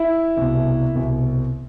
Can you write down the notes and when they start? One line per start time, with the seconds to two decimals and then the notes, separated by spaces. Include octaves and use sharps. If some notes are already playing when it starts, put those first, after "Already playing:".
Already playing: E4
0.37 C2 B2
0.94 C2 B2